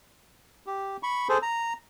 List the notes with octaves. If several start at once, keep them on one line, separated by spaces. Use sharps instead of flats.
G4
B5 C#6
G#4 A4 C5
A#5